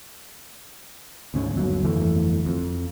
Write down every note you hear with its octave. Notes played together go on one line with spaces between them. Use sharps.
D2 G#2 D#3 C#4
G1 D#2 F#3
G1 F2 E3 A3
F2